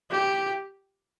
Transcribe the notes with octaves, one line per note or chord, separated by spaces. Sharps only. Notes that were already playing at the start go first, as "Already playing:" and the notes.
G4